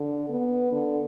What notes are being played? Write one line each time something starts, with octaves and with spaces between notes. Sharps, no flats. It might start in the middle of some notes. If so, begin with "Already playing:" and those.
Already playing: D3
B3
D3